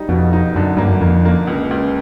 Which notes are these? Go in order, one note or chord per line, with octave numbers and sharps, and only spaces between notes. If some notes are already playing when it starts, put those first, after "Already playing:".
Already playing: G3 D#4
F2 B2
D#4
F#2 D3
G2 A#3
F#2
F2 A#3
A#3
C#2
C#2